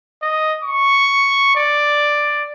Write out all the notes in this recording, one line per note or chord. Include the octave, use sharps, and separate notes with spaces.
D#5
C#6
D5